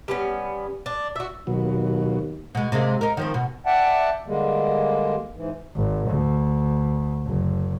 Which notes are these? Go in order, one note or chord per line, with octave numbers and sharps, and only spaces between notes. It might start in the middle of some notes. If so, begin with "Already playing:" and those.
G3 B3 C#4
D4
F#4 E5
D#2 B2 F#3
B2 G#3
C3 G#3 A#3
D#4 A#4
D#3 F3 C4
B2
D5 E5 F#5 G5 A5
D3 G3 G#3 A#3
G#2 E3
G#1
D2
F#1